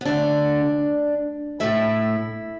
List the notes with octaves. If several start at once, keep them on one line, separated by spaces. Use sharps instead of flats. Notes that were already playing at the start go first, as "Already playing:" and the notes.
B3
D2 D3 A3 D4
A2 A3 E4 E5